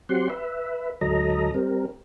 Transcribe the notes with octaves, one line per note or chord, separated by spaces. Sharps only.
F#3 C4 G4 F#5 C6
B4 E5
D2 G#2 F#3 A4 D#5 A#5
G3 C4 A#4